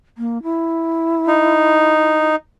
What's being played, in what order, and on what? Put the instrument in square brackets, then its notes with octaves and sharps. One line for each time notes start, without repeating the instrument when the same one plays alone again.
[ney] A#3
E4
[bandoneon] D#4